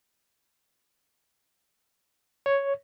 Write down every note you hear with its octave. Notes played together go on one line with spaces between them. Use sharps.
C#5